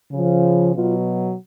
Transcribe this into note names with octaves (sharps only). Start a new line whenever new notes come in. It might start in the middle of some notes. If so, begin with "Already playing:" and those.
C#3 F3
B2 F#3 F4